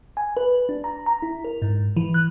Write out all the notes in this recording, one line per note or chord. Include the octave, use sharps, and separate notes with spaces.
G#5
B4
D4
A#5
A#5
E4
A#4
G#2
E3
F#6